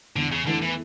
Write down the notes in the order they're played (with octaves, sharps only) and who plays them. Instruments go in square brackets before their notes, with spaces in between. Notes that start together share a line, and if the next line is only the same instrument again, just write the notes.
[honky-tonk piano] E2 [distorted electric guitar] D3
[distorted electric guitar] C#3
[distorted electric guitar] D3 [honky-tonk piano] E3 A3 E4
[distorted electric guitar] E3